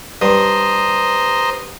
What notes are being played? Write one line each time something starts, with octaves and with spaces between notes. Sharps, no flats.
G2 C5 A#5 D#6